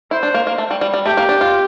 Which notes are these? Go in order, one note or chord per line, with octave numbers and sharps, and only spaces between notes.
E4 C5
D4
A#3
A#3
A3
G3
G3
G3
A3 G4
A#3
D4
F4